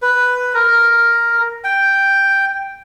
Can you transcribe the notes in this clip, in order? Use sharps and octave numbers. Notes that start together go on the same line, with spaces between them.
B4
A#4
G5